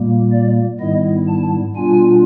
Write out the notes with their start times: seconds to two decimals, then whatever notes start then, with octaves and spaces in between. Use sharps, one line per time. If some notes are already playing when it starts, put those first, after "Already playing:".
Already playing: A#2 G3 A#3
0.32 D5
0.80 G#2 D#3 G3 B3 E4 D#5
1.28 A5
1.76 B2 G3 B3 D4 F4 G#5